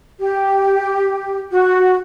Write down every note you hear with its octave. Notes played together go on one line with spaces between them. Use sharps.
G4
F#4